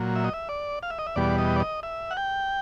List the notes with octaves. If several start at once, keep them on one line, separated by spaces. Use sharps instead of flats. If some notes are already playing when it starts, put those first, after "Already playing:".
Already playing: A#2 F#3
E5
D#5
E5
D5
F5
E5
D#5
E5
E2 B2 G3 D5
D#5
D5
D#5
E5
F#5
G5